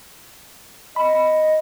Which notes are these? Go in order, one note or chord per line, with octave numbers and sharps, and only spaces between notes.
D#5 B5